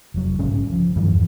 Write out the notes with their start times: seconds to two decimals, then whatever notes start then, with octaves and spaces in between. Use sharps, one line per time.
0.14 F1 F#3
0.39 A#1 G#2 C#3 C#4
0.72 F3
0.96 G2 D#3 E3
1.12 E2